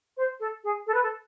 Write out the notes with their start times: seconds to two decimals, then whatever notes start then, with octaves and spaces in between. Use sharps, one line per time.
0.17 C5
0.40 A4
0.64 G#4
0.87 A4
0.94 B4
1.03 A4